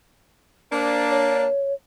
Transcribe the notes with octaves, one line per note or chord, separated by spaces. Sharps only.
A#3 D4 C5
C#5